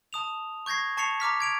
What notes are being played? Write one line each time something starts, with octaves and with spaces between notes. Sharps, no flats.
A5 D#6 F7
C#6 G6 G#6 A#6 C7
A5 C#6 A6 C7 C#7 F7
A#5 D6 F6 B6
G#6 D7 F7